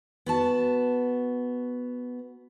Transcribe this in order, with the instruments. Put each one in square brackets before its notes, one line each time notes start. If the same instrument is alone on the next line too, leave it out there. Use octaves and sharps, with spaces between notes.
[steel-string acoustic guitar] B3 F#4 A5